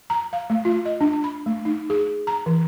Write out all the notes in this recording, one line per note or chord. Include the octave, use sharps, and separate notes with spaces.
A#5
F5
A3
F4
D#5
D4
B5
A3
D#4
G#4
A#5
E3